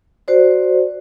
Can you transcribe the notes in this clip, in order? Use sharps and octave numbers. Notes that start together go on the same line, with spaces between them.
F#4 C5 D5